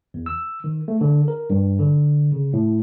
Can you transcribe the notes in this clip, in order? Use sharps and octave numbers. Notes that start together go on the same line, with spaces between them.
E2
E6
D#3
A3
D3
A#4
G2
D3
C#3
A2